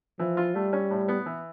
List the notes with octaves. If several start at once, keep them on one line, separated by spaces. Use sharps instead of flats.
E3 F3
F4
G3 A3
C#4
A2
B3
E3